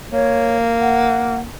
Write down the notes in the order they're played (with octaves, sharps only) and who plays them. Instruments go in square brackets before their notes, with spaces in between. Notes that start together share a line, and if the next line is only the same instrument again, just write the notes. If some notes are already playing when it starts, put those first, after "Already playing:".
[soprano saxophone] A#3 [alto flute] C#5
[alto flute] F#5